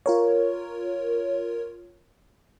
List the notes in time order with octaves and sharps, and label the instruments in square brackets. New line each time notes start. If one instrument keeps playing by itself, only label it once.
[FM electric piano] F4 A#4 C#5